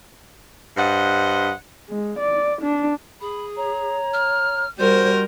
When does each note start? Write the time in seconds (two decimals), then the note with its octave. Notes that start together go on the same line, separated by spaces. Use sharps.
0.77 G2 C5 D#5 F#5
1.89 G#3
2.19 D5
2.62 D4
3.21 G#4 B5
3.56 C#5 A#5
4.13 F6
4.78 G3 F#4 A#4 C5 C6 G6